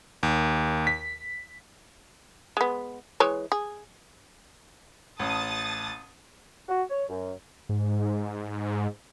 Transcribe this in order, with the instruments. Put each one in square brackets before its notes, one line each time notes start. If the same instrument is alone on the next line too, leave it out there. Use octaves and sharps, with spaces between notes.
[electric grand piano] D#2
B6
[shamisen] G#3 B3
E3 G#3 C#5
G#4
[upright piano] A1 [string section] A5 D#6 A6
[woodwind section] F#4
C#5
F#2
[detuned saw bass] G#2